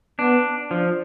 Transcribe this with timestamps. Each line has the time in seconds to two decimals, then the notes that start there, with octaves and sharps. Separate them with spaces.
0.19 B3 D4
0.71 F3 D4